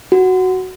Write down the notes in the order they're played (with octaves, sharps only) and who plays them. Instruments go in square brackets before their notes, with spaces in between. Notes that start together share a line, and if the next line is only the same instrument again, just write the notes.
[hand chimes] F#4